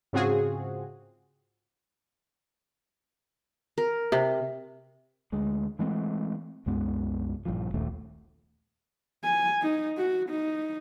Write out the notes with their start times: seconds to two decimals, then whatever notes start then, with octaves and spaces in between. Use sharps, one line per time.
0.13 G#2 C#3 C4 F4 F#4 G#4
3.78 A#4
4.12 C3
5.32 D2 G#3
5.79 E3 G#3 A3 C4
6.66 C2 F#2 G#3 B3
7.45 A#1 G2 F3
7.74 D#1 A#1 D#2 A3
9.24 G#5
9.62 D#4
9.97 F#4
10.29 D#4